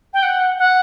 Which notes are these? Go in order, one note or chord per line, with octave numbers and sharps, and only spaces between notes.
G5
F#5
F#5